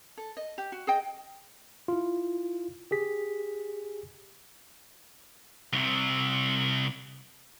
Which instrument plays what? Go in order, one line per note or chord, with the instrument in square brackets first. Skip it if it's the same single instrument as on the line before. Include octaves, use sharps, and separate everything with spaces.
[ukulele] A4
D#5
G4
F#4
G#4 D#5 G5
[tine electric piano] E4 F4
G4 G#4 B6
[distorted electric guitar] C2 C3